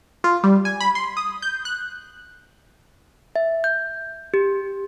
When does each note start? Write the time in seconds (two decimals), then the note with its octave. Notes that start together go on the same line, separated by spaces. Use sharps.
0.24 F4
0.43 G3
0.65 G#5
0.80 B5
0.95 C6
1.17 D#6
1.42 G6
1.65 F#6
3.36 E5
3.64 G6
4.34 G4